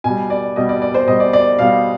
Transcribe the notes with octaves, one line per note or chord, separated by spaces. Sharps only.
B2 G3 G#5
D5
B2 G3 D#5
D5
D5
C5
B2 G3 D#5
D5
D5
B2 G3 F5